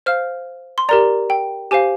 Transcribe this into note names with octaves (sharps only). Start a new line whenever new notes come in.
C5 F5 F6
C6
G4 A#4 D5 A#5
G5
G4 C5 F5 G#5